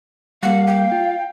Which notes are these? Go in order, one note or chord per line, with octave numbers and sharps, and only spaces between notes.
G3 A#3 F5 F#5
G5
F4